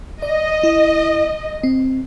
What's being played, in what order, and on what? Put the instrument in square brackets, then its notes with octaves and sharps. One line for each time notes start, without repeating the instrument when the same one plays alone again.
[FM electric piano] D5 [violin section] D#5
[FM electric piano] E4
C4